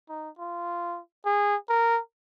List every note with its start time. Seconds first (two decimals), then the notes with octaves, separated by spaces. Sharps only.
0.09 D#4
0.39 F4
1.25 G#4
1.69 A#4